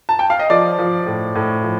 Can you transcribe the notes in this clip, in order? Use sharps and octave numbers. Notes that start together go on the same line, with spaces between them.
A5
G5
F5
D#5
F3 D5
F3
A2
A2
F3